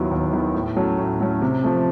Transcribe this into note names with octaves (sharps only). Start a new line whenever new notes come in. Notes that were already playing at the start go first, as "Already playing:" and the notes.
Already playing: D#2 D#3 F#3 B3 E4
D#2
D#3 F#3 B3 E4
A2
F#3 A3 C#4
A2
F#3 A3 C#4
C3
F3 A3